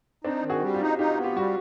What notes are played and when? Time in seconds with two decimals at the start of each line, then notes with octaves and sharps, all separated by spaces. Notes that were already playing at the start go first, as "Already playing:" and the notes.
0.24 C4 D4 D#4
0.43 D#3
0.49 F#4 G#4
0.62 G3
0.74 F4 G4
0.81 D#4
0.98 D#4 F4 G4
1.17 B3
1.23 F4 G4
1.35 G3 F#4